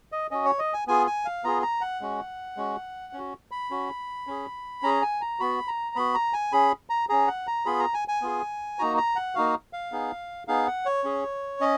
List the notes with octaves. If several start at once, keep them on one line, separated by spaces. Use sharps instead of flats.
D#5
C#4 F#4 D#5
C#5
D#5
G#5
B3 F4 G#4 G#5
G#5
F5
B3 F4 G#4 A#5
A#5
F#5
G#3 C#4 F#4
G#3 C#4 F#4
C#4 F#4
B5
C#4 F#4
C#4 G#4
C#4 G#4 A#5
G#5
A#5
B3 F#4 B5
A#5
B3 F#4 B5
A#5
G#5
C#4 G#4 B5
A#5
C#4 G#4 A#5
F#5
A#5
B3 F4 G#4 B5
A#5
G#5
G#5
B3 F4 G#4
A#3 D#4 F#4 A#5
A#5
F#5
A#3 D#4 F#4 F5
F5
B3 D#4 G#4
B3 D#4 G#4 F5
F#5
C#5
C#4 G#4
C#4 D#5